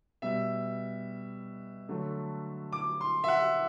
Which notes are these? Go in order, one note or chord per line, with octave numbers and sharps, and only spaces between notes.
B2 G3 E5
D3 F#3 A3
D6
C6
E5
F#5